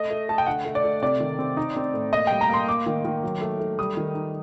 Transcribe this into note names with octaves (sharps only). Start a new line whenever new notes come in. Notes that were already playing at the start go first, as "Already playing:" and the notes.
Already playing: A3 D#5
A3
A3 A5
G5
D3 F#5
A3
D5
A3
C3 D5
D#3
C4
D#4
C4
A2
A#3 D#5
G3 G5
A#5
A#3 C6
A#3 D6
D#3
D#3
F#3
A3
A3
G3 D#6
D#3
D#4